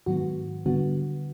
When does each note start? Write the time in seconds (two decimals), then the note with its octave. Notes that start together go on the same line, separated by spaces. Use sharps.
0.06 G#2 D#3 F#3 B3 F#4
0.66 D3 G3 B3 F#4